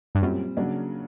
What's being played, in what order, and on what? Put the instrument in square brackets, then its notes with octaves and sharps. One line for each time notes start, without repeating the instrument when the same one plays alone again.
[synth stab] G2
[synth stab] F#2 [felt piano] A#2 G3 C4
[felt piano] C#3 F#3 A#3 D4